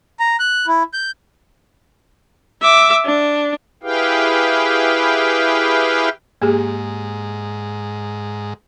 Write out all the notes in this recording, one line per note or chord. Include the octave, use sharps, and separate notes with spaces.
A#5
F#6
E4
G6
E5 D6
D4
E4 G4 G#4 B4 F5 G5
G#2 A#3 G4 G#4